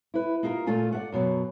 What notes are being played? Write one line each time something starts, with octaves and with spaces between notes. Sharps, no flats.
E4 B4
A#3 D#4 F4 G4 A#4
A#2 A3 F4 F5 G#5
D5 E5 F#5
F#2 B2 F3 F#3